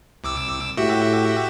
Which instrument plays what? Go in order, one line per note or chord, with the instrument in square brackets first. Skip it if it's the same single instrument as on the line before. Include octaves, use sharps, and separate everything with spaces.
[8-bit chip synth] C2 D6 E6
[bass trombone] A2 [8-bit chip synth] F#4 G4 E5